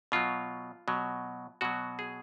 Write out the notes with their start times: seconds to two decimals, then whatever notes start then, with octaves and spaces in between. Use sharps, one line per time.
0.12 B2 F#3 F4
0.88 B2 F#3
1.61 B2 F#3 F#4
1.99 G#4